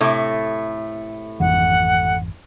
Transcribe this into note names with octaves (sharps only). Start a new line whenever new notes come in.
A2 C3 A3
G#1 F2 E3 F#5